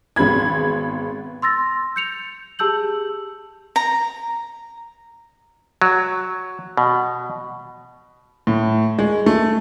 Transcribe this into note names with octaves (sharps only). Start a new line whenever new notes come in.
G#1 B2 G#3 B3 B5 G#6
C6 E6 A6 A#6
G6 C#7 F7
G4 G#4 A5 E6 G6 F#7
A#5
F#3
B2
A2
G#3
A3